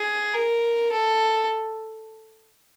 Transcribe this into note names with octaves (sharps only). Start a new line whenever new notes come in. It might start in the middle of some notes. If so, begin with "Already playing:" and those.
Already playing: G#4
A#4
A4